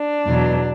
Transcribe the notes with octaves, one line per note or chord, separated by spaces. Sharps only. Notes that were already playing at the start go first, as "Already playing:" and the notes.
Already playing: D4
E2 B2 F#3